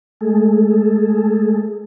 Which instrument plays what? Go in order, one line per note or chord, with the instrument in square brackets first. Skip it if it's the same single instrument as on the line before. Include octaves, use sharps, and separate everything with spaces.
[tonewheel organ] G#3 A3 G#4 A4